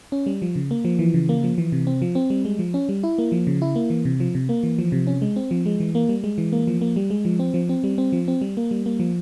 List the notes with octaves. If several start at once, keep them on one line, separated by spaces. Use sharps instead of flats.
C#4
G3
F3
C#3
A#3
F3
E3
C#3
A#3
F3
E3
C3
C4
F3
C4
G3
G#3
F3
C#4
G3
E4
A#3
F3
C#3
E4
A#3
E3
C3
F3
C3
A#3
E3
F3
C3
C#4
G#3
C4
F3
G#3
E3
A#3
G3
G#3
E3
A#3
F3
A#3
G3
G#3
F3
C4
F3
C4
G3
C4
F3
C4
G3
A#3
G3
A#3
F3